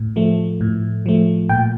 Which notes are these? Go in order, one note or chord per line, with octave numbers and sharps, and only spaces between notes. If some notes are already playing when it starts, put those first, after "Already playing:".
Already playing: A2
F3 A3
A2
F3 A3
A#2 G5